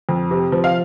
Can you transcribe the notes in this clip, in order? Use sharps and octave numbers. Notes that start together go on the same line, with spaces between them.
F2
C3
F3
F5